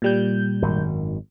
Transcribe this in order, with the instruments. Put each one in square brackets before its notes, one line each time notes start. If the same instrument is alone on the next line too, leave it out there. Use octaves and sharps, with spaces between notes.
[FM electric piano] A#2 G3 G6
[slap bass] G#1 F#2 D#3